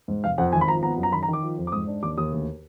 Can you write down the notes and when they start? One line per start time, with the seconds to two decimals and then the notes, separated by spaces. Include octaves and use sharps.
0.08 G#2
0.24 F1 F5
0.38 F2 F#5
0.53 G#1 G#5
0.61 B5
0.68 F3 A#5
0.83 B3 A#5
0.98 F#2
1.03 A#5
1.12 D#3 B5
1.23 A#5
1.28 D#3
1.33 D6
1.43 F3
1.58 F2
1.67 D6
1.72 G#2 D#6
1.87 D4
2.02 D#2 D6
2.17 D#2 D#6
2.32 D2